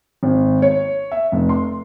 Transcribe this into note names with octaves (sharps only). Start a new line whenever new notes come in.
G#1
C#5
E5
F1
C6